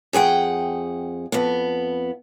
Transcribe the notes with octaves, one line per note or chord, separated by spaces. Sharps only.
F2 G#4 F#5 G5
F2 B3